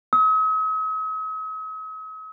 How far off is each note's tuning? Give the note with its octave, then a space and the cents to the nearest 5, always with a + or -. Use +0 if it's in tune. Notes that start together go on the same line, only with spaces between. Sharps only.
D#6 +45